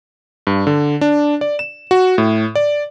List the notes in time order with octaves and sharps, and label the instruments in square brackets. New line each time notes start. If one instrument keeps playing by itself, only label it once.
[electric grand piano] G2
D3
D4
D5
E7
F#4
A2
D5